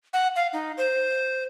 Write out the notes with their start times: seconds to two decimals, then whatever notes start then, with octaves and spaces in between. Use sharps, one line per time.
0.13 F#5
0.36 F5
0.53 D#4
0.78 C5